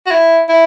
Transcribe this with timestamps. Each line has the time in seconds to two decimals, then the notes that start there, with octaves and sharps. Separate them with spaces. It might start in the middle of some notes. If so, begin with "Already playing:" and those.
0.06 F#4
0.11 E4
0.49 E4